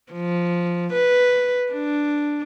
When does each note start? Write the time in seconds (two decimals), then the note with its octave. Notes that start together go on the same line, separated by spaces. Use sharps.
0.13 F3
0.93 B4
1.72 D4